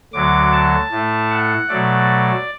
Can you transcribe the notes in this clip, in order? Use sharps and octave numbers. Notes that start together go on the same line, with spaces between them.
D2 D3 F#3 D6
A5
A2 A3
F#5
B2 F#3 A3 D5